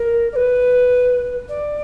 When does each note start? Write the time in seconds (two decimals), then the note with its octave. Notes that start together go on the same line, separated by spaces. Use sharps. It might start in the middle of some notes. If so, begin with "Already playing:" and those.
Already playing: A#4
0.32 D5
0.35 B4
1.48 D5